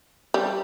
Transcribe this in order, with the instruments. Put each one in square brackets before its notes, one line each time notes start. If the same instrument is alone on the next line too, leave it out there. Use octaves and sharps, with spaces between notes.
[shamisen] G3